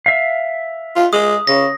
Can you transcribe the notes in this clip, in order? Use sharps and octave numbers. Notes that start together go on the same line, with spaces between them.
E5 F5
F4
G#3 D#6
C#3 A#6